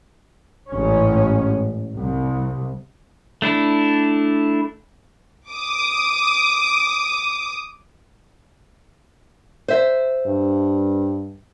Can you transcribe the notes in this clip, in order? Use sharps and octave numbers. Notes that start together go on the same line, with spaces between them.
A1 G#2 C#4
C2
A3 D4 E4
D6 D#6
C5 E5
G2